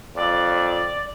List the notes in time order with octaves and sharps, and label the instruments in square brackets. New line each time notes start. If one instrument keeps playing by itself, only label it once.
[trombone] F2 [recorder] D5